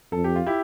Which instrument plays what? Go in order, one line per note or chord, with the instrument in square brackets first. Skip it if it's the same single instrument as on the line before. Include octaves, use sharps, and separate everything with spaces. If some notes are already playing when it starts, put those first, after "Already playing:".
[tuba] F2 [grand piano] A4
[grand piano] G4
F4
E4 G4